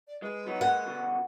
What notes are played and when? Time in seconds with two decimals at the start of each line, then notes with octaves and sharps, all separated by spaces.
0.08 D5
0.22 G#3 B4
0.46 F#3 B3 D#4
0.61 G3 G#3 A#3 F#5
0.86 B2 D3